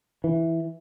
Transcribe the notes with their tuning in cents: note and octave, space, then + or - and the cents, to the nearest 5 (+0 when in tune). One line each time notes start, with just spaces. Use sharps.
E3 -5